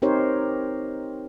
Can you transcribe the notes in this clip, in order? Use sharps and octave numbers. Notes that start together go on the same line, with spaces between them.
C4 D#4 G4 A#4 C5 C#5